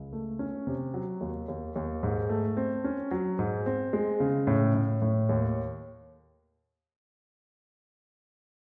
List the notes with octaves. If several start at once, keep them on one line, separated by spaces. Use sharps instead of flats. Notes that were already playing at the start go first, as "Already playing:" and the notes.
Already playing: C#2
A3
C#4
C3
F#3
D#2
D#2
D#2
G#2
A3
C4
C#4
F#3
G#2
C4
G#3
C#3
A2
A2
A2
D#2